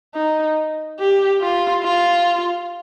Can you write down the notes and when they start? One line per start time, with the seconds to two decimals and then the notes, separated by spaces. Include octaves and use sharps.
0.15 D#4
0.99 G4
1.42 F4
1.83 F4